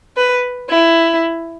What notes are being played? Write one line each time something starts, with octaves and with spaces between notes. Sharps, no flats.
B4
E4